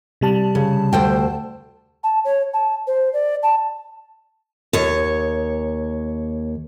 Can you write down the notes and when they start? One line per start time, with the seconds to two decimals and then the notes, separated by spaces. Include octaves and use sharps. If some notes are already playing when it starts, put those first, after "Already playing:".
0.21 C3 G3 A5
0.55 C#3
0.93 D2 C5 G5
2.04 A5
2.25 C#5
2.54 A5
2.87 C5
3.13 D5
3.43 A5
4.73 D#2 C#5